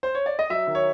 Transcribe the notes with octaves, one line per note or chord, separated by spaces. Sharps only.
C5
C#5
D5
D#5
F#3 E5
D#3
C#5